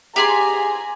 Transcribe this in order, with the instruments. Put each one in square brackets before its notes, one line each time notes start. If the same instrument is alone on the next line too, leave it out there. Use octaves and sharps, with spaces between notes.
[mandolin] G4 G#4 C6 [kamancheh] G#5 A#5